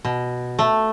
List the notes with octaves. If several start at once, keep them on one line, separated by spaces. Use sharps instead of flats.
B2
A3